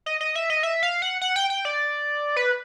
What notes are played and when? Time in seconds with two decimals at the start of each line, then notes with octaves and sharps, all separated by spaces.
0.06 D#5
0.21 D#5
0.35 E5
0.50 D#5
0.63 E5
0.83 F5
1.02 F#5
1.21 F#5
1.36 G5
1.50 G5
1.65 D5
2.36 B4